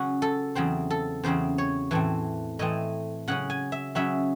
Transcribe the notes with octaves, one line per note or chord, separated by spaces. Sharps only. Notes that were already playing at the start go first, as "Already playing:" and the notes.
Already playing: C#3 F#3 C#4 F#4
A4
E2 C#3 F#3 C4 C5
A4
E2 C#3 F#3 C4 C5
C#5
A2 E3 A3 C4
A2 E3 A3 C4 D#5
C#3 F#3 C#4 F#5
G#5
E5
C#3 F#3 C#4 E5